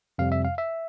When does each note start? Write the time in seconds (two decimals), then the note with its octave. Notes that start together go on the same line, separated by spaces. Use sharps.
0.18 F2 C3 G3 F5
0.32 E5
0.45 F5
0.58 E5